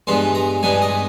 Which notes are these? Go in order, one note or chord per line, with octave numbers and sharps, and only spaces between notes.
G2 E3 G#3 B3 C6
A#5
G2 E3 G#3 B3 G#5
D#5